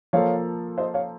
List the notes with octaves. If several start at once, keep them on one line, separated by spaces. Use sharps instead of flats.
F3 A#3 F4 A4 C#5 F5
C5 D#5
C#5 F5